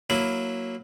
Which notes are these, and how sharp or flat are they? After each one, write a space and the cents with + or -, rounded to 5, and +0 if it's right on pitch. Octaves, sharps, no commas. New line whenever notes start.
F#3 +0 A#3 +0 E4 +0